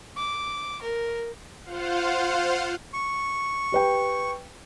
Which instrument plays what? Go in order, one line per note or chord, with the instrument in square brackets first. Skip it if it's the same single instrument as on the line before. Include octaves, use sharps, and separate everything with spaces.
[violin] D6
A#4
[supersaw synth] F4 C5 F5 F#5
[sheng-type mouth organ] C#6
[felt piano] G4 B4 G5